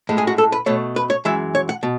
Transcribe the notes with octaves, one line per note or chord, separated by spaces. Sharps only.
A2 G#3
G#4
F#4
A4
B4
B2 A3 C#5
B4
C#5
F#2 E3 G#3 E5
C#5
F#5
B2